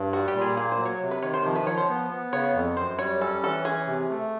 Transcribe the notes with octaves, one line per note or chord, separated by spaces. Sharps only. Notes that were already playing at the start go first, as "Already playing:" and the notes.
Already playing: G2
G3 F#4
G4
A#2
G#4
A#3 G#4
C5
F#3
C#5
C3
B4
D#3 C#5
C5
F3
B4
F3 C#5
C5
B3
B3
C#3 C#5
F2
F#2 C5
G3 C#5
C#4 A4
E3 A4
C#4 G#4
C3
A3